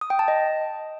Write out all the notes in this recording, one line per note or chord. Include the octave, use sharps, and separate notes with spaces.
D#6
G5
A5
D#5